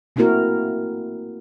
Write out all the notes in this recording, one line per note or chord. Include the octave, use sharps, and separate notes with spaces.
A3 A#3 C4 E4 F#4 A#4